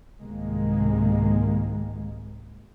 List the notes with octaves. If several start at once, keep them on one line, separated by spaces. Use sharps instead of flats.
C2 G#2 C3 D#3 G#3 A#3